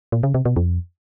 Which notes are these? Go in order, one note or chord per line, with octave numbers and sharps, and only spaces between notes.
A#2
C#3
C3
B2
F2